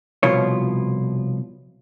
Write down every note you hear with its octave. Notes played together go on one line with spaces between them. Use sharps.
C2 B2 F3 E4 F4 C#5